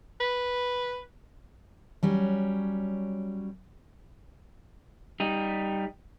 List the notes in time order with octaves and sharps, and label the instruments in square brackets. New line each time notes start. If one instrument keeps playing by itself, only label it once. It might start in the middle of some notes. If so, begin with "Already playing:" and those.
[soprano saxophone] B4
[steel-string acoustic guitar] F#3 G3 C#4
[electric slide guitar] G3 D#4